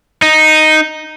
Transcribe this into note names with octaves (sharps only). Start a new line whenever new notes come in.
D#4